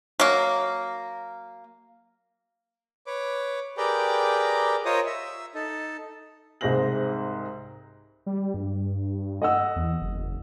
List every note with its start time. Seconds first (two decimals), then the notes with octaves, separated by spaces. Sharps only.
0.20 F#3 A#3
3.06 B4 C#5 D6
3.77 G4 G#4 A#4 B4 D5 G5
4.85 F4 A#4 C5 C#5 D#5 D#6
5.07 E5
5.55 D#4 A4
6.61 C2 G#2 G#4 C5 A#6 F#7
8.26 G3
8.54 G2
9.42 D#5 F#5 E6
9.76 E2
10.02 F#1